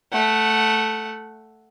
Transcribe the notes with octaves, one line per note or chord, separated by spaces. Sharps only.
A3 F#5